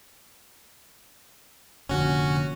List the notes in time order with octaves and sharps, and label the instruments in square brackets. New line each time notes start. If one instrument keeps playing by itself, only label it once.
[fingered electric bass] F1 A#2 D3 [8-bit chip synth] C#4 F#4